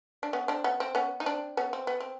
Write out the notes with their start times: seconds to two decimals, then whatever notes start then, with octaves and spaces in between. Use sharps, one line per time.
0.23 D4
0.33 B3 C#4
0.48 C4 D4
0.64 B3 C#4
0.80 C4
0.95 B3 C#4
1.20 D#4
1.26 C4 D4
1.57 B3 C#4
1.73 C4
1.87 B3
2.00 C4